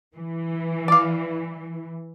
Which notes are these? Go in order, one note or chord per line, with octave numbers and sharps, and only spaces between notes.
E3
D5 F5